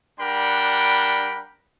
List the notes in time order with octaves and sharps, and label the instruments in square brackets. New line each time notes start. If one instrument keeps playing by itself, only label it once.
[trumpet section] G3 D4 A#4 F#5 G5 B5